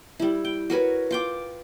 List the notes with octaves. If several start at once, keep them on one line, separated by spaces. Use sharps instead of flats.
G3 E4
G5
F#4 A#4 B4 C#5
F4 G5 D6